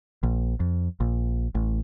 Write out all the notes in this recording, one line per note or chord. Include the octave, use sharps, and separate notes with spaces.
A#1
F2
A#1
A1